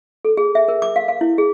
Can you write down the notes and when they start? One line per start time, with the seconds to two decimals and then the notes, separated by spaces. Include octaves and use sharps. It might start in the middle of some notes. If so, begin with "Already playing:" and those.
0.25 A4
0.37 G#4
0.55 E5
0.68 A#4
0.82 D6
0.96 F5
1.08 F5
1.21 E4
1.38 G#4